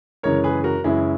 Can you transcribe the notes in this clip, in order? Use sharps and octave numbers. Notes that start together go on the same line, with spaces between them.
F#2 C#3 E3 G#3 A#4 C#5
G#4 B4
F#4 A#4
F#2 C#3 E3 G#3 E4 G#4